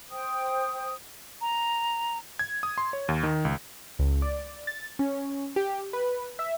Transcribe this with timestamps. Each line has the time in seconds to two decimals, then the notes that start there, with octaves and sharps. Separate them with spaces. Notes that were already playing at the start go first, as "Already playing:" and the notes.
0.10 C5 G5 D#6
1.41 A#5
2.39 G#6
2.63 D#6
2.78 C6
2.93 C#5
3.09 D#2
3.23 D#3
3.45 C#2
3.99 C#2
4.22 D5
4.67 A6
4.99 C#4
5.56 G4
5.93 B4
6.39 E5